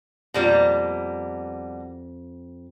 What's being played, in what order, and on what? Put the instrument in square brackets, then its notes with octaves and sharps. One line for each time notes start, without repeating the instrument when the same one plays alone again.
[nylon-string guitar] F2 F4 [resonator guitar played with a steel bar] B2 G3 A#3